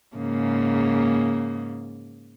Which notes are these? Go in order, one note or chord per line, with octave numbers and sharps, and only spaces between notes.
G#2 C#3 A#3